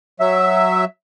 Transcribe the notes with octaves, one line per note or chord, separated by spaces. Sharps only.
F#3 E5